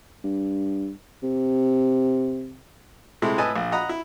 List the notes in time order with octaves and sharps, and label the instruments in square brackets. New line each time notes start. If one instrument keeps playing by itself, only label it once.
[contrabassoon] G2
C3
[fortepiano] C3 G#3 A3 E4
A2 B4 D#5 G#5 A5
A#1
D#5 F#5 A#5 B5
E4